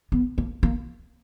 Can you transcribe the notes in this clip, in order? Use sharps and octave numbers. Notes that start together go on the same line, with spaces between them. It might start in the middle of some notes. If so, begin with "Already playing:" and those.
B3
A#3
A#3